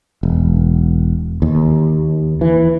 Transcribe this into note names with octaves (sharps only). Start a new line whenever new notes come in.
E1
D#2
E3